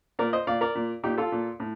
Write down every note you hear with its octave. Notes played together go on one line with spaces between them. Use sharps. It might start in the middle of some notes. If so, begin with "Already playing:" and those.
A#2 A#4 D5
C5 D#5
A#2 D5 F5
A#4 D5
A#2
A#2 D#4 G4
F4 A4
A#2
A2